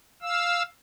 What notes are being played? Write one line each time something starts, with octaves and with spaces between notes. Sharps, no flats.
F5 E6